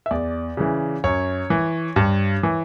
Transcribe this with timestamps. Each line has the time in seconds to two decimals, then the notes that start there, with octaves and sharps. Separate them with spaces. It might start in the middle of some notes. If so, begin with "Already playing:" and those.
0.06 E5
0.11 E2 D5
0.57 C#3 E3
1.04 F#2 C#5
1.50 E3
1.96 G2
2.43 E3